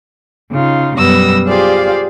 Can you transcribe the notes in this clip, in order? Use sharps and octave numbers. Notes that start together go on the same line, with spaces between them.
C#3 D#4 F4
F#2 B2 G3 B3 E6 A#6
F4 G4 G#4 C5 D5 F5